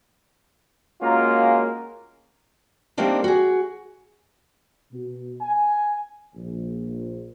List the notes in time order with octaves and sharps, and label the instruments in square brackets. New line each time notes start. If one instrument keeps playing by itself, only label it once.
[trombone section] G#3 A#3 C#4 F4 F#4 A#4
[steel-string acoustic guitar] G3 A3 A#3 C4 D4 D#4
F#4 G#4
[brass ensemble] B2
G#5
A#1